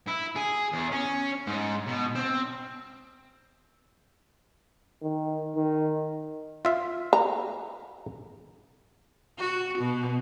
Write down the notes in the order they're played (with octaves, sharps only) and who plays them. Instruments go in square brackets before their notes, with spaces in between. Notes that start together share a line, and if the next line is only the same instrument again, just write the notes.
[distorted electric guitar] E4
G#4
E2
C#4
G#2
B2
C4
[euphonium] D#3
D#3
[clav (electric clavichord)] F4 E5 F5
[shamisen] A#5
[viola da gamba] F#4
B2